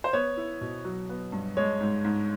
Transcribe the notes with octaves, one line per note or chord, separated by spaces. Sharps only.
C5
B3 C#5
E4
B2
F#3
B3
G2
G#3 C#5
G#2
G#2